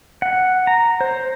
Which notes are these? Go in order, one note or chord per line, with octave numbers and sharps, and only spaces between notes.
F#5
A#5
C5